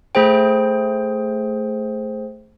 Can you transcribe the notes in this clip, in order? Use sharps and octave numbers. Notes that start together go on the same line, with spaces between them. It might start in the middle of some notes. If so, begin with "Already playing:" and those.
A3 G#4 C5 G5